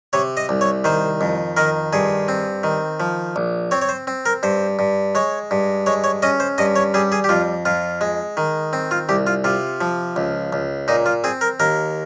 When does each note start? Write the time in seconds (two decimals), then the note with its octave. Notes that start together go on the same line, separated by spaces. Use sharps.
0.13 C3 C#5
0.37 D#5
0.49 C2
0.61 C#5
0.84 D#3 C5
1.21 F2
1.57 D#3 A#4
1.93 G2 G#4
2.28 C4
2.64 D#3
3.00 F3
3.36 A#1
3.71 C4 C#5
3.82 C#5
3.89 C5
4.07 C4
4.26 A#4
4.43 G2 C5
4.79 G2
5.15 G#3 C#5
5.51 G2
5.86 G#3 C#5
6.04 C#5
6.22 C#4 D#5
6.40 C5
6.58 G2 D#5
6.76 C#5
6.94 G3 G#4
7.12 G#4
7.24 G4
7.29 F2 F4
7.65 F2 F4
8.01 G#3
8.37 D#3
8.73 C4
8.91 F4
9.09 C2 G4
9.27 F4
9.44 C3 F4
9.81 F3
10.16 C#2
10.53 C#2
10.88 A#2 D#4
11.06 F4
11.24 C4 G#4
11.41 A#4
11.60 D#2 A#4